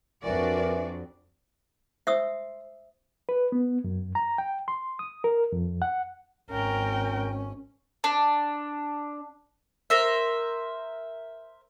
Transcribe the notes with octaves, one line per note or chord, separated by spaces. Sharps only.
F2 D4 F#4 A#4 B4 D5 E5 G#5
C5 E5 D#6 E6
B4
B3
F#2
A#5
G5
C6
D#6
A#4
F2
F#5
G#1 C#4 A#4 G5
D4
A#4 C5 E5